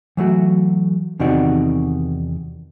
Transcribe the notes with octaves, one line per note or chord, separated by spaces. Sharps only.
E3 F#3 A3 F#4
E2 C3 D#3 D#4 F#4 D5